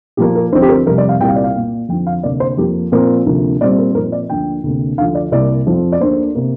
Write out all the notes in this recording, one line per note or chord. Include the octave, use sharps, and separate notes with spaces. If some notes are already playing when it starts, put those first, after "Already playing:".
A#2 F3 A#3 G4
A#4
D2 D3 F3 C4 C5
G4
A#4
F2 C3 G3 A#4
D5
F5
C2 A#2 G3 A#3 G5
F5
D5
F5
A#2 A#3
F2 D3 F3 C4 G5
F5
D2 C3 A#3 D5
C5
F2 F3 A#3 G4
A#2 F3 C4 A#4
D2 C3 F3 A#3
A#2 G3 C4 D5
A#4
C5
A#2 F3 C4 A#4
D5
D2 D3 F3 A#3 G5
D2 C3 A#3
D2 D3 F3 F5
D5
C2 C3 A#3 D5
F2 F3 C4
D5
D2 D3 A#3 C5
C3 A#3